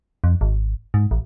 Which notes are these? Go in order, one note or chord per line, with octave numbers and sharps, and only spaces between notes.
F2
G#1
G#2
A1